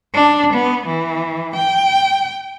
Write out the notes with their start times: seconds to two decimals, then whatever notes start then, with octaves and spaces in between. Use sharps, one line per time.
0.14 D4
0.54 B3
0.87 E3
1.56 G5